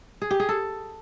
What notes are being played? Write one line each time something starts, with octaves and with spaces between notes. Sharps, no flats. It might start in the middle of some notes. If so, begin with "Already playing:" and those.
G#4
G4
G#4
A4